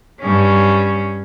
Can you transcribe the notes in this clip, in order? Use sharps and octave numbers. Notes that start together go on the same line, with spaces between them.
G2 C#4